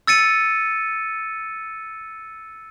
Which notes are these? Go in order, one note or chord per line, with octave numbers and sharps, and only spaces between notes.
E6 A6 C#7 D#7